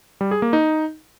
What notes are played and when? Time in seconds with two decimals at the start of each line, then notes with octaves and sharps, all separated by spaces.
0.21 G3
0.31 G#4
0.42 A#3
0.53 D#4